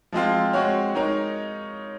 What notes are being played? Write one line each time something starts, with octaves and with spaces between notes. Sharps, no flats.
F3 G#3 C4 F4
G#3 C4 F#4 C#5
G#3 D#4 A#4 C#5